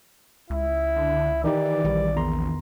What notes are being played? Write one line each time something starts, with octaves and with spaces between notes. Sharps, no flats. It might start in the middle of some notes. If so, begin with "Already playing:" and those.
C#2 E4
D3
D#3 E3 D#4 G4 D5
A#1 D#3 E3 G3
E2 A#5 C6